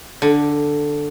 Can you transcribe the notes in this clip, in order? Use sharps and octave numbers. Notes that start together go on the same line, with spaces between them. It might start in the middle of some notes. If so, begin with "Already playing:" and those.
D3